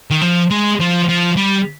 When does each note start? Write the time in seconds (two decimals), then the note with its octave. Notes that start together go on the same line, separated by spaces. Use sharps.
0.11 D#3
0.21 F3
0.50 G#3
0.80 F3
1.09 F3
1.37 G3